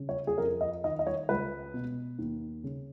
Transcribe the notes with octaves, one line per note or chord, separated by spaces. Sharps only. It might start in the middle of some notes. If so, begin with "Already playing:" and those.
Already playing: C#3
C#5
G#4
F2 A#4
D#5
D#3 D#5
D#5
C#5
C#2 B4
B2
D#2
C#3